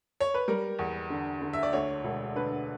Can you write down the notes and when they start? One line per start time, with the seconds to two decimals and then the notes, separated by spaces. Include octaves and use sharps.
0.20 C#5
0.34 B4
0.48 G3 A#4
0.79 E2
1.10 D3
1.42 D3
1.53 E5
1.63 D5
1.73 D2 C#5
2.04 E1
2.36 D3 B4